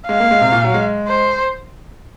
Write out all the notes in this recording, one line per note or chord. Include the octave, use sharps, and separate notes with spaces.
G#3 F5
A#3
G#3
C3
A#2
F#3
G#3
C5